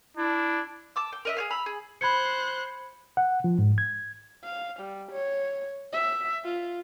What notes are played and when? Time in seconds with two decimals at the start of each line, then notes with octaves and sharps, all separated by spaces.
0.17 D4 E4
0.96 A5 D6 E6
1.13 G5
1.25 A#4 D#5 E5
1.37 G#4 C#5 F5
1.50 A#5 B5 E6
1.66 G#4
2.01 C5 B5 F#6 G#6 C#7
3.17 F#5
3.44 F3
3.59 G#2
3.78 G#6
4.44 F5
4.80 G3
5.12 C#5
5.92 E5
6.45 F4